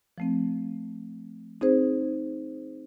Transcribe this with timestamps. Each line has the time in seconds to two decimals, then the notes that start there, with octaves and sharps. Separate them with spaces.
0.18 F3 A3 C4
1.61 C4 D#4 G#4 C5